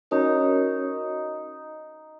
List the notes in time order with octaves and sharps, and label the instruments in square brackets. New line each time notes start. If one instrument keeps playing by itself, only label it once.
[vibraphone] C#4 F#4 A#4 C#5 [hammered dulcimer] D#4